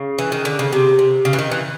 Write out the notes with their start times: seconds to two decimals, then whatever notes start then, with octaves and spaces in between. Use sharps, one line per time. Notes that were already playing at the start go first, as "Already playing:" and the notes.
Already playing: C#3
0.19 E3
0.32 D#3
0.45 D3
0.59 C#3
0.73 C3
0.99 C3
1.25 C#3
1.33 E3
1.39 D#3
1.52 E3